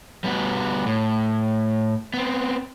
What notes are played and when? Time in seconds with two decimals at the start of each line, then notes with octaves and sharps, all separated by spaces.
0.24 G3 B3 F#4
0.86 A2
2.14 B3 C4